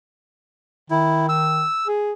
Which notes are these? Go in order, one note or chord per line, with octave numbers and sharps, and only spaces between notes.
D#3 E4
E6
G#4